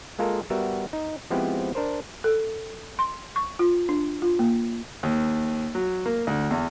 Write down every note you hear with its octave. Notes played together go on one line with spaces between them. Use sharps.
G#3 A#3 F4 A4 A#4
G3 B3 F#4 A#4 E5
D#4
F3 G#3 B3 C4 E4 G4
D4 A#4 C5
A4
C6
C#6
F4
D4
F4
A#3
D#2
F#3
A#3
D2
E2